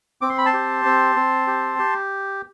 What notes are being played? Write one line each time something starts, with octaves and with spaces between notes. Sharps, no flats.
C4 D6
C6
B5
A5 C6
G4
C4
C4
G4
G4